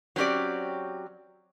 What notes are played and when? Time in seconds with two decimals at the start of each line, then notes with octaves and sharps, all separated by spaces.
0.16 F#3 C4 C#4 G4 D5